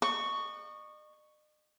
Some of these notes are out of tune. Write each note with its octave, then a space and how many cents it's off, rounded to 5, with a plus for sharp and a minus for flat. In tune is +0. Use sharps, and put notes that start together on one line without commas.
D#5 -40 C#6 +0